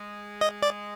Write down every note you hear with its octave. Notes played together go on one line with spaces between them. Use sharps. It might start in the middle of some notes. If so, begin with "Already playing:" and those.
Already playing: G#3
D#5
D5